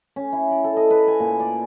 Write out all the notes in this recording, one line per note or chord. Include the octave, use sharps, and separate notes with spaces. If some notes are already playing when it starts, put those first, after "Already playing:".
C#4
E4
D5
A4
D#5
B4
G#5
A#2
D5